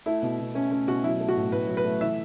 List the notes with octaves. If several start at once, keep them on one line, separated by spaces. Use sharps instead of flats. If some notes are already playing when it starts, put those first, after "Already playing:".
A3 E4
B2
B2
A3 C#4
A3 C#4
B2 F#4
F#3 E4
A3
F#4
A2
A2 B4
F#3
B4
A3
E3 E5